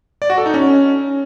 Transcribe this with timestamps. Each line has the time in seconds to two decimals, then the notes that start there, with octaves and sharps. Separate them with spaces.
0.22 D5
0.30 F#4
0.38 A4
0.46 D#4
0.54 C#4